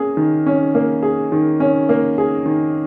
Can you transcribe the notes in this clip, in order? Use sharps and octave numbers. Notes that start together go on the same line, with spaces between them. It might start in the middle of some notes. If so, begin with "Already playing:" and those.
Already playing: A#3 C#4 G#4
D#3
C#4
A#3
G#4
D#3
C#4
A#3
G#4
D#3